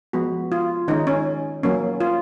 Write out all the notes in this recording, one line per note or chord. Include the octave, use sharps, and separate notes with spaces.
F3 G#3 B3 F#4
F4
D#3 G#3 C#4 D#4
C#4
F#3 A#3 C#4
F4